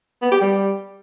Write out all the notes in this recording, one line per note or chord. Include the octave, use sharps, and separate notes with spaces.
B3
G4
G3